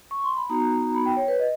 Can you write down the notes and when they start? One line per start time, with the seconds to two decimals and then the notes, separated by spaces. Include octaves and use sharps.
0.11 C#6
0.24 C6
0.37 B5
0.50 B3 D#4 F#4 A#5
0.95 B5
1.06 G5
1.17 C#5
1.28 B4
1.40 D#5